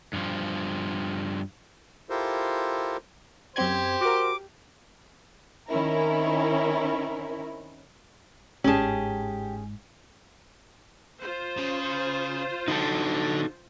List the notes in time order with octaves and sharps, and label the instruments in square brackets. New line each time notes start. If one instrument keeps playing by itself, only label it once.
[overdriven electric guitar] G2 F3
[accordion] E4 F4 G4 A4 A#4 C5
[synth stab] F#2 C4 G#6 [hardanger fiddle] G4 [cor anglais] C5
[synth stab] F#4 A#4 [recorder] D6
[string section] D#3 C4 C#4 E4 A#4
[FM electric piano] G1 [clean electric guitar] G#2 [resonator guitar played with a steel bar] C#4 G#4 [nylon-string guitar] G4 A5
[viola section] F4 C5
[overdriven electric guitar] C#3
[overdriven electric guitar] D3 [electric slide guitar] D#4 F#4 A4